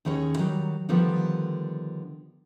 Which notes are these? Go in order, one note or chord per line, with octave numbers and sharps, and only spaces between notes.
D#2 D#3 C#4 G#4 C#5
D#3 F#3 G3
D3 D#3 F3 G3 B3